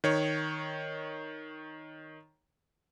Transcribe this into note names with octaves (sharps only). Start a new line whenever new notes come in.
D#3 C#5